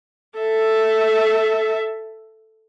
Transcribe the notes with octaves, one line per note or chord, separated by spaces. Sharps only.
A4 E5